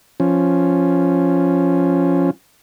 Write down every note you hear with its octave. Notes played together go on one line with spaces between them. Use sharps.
F3 C#4